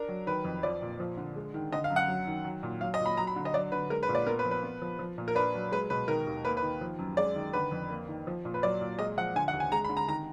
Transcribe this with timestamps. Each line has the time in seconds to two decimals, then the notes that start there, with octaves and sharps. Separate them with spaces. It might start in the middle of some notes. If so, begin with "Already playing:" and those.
Already playing: D4 A#4
0.08 F#3
0.27 D#3 B4
0.44 F2
0.63 F3 D5
0.82 A#2
1.00 F3
1.17 D3
1.36 G#3
1.54 D#3
1.72 D3 D#5
1.84 F5
1.90 F#2
1.96 F#5
2.08 F#3
2.27 D#3
2.44 F#3
2.63 A#2
2.81 F#3 F5
2.94 D#5
3.00 A#2
3.06 B5
3.17 F#3 A#5
3.27 B5
3.36 D3
3.45 D#5
3.54 F#3 D5
3.72 D3 B4
3.90 G#3 A#4
4.03 B4
4.09 A#2
4.15 D5
4.26 B3 A#4
4.39 B4
4.45 F3
4.51 B4
4.63 B3
4.82 F3
4.99 F3
5.18 A#2
5.28 A#4
5.35 D4 B4
5.54 F#3
5.72 G#3 B4
5.90 B2 B4
6.08 D#3 A#4
6.27 D#2
6.45 A#3 B4
6.57 B4
6.62 D#3
6.81 F3
6.99 F#2
7.17 G#3 D5
7.36 D#3
7.53 D3 B4
7.71 F2
7.90 A#3
8.08 D#3
8.27 F3
8.45 A#2
8.54 B4
8.63 F#3 D5
8.81 A#2
8.99 G#3 D#5
9.18 F3 F#5
9.36 D3 G#5
9.48 F#5
9.53 D#2
9.60 G#5
9.72 G#3 A#5
9.84 B5
9.89 D3
9.97 A#5
10.08 D#3 A#5